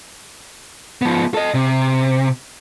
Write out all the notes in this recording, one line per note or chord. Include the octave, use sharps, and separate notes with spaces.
F3 B3
A4 D#5
C3